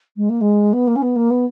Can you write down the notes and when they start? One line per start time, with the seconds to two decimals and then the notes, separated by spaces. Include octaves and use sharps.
0.17 G#3
0.29 A#3
0.41 G#3
0.73 B3
0.87 A#3
0.96 C#4
1.02 B3
1.16 A#3
1.30 B3